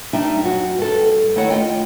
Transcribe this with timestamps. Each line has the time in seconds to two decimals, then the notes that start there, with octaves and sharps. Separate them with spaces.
0.13 G3 D4 D#4 E5 G5
0.43 F#2 F#4
0.78 G2 A4
1.36 D#3 A3 E4 A4 C#5 F#5
1.50 F4 D#5 G5